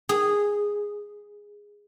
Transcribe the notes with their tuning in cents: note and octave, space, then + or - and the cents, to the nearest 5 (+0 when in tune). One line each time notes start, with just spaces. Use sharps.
G#4 -10